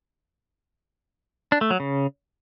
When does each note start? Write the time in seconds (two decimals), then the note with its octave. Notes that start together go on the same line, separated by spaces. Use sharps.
1.52 D4
1.61 A3
1.71 F#3
1.80 C#3